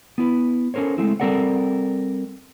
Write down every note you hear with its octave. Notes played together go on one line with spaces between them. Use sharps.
B3 E4 B4
C#4 A4 A#4 C5 C#5
G#3 A3 C4 E4
G3 C4 A4 A#4 D5 F#5